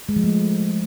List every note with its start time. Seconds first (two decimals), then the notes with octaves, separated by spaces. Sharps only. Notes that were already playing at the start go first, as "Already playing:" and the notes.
0.09 G#3
0.16 F3
0.24 A3